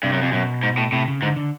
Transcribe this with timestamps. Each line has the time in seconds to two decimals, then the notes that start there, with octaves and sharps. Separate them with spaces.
0.03 G2 C3
0.13 F#2
0.22 F2
0.32 F#2 B2
0.63 G#2
0.78 A2
0.92 A2 C3
1.08 C#3
1.22 G#2 D3
1.36 D3